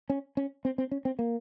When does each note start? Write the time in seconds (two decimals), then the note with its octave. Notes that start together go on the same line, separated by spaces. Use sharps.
0.10 C#4
0.37 C#4
0.65 C4
0.78 C4
0.91 C#4
1.05 C4
1.19 A#3